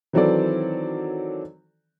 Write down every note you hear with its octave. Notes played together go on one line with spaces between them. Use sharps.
D#3 E3 F#3 C4 A4 D5